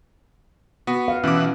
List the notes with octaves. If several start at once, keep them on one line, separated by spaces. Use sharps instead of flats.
B3 F#4
F5
B2 E3 C#4 F#5 D6